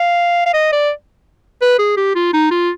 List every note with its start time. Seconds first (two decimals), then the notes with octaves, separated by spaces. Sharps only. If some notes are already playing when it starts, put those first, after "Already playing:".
Already playing: F5
0.46 F5
0.54 D#5
0.72 D5
1.62 B4
1.79 G#4
1.97 G4
2.15 F4
2.33 D#4
2.51 F4